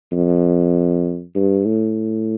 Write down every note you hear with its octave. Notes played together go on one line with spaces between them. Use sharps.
F2
G2
A2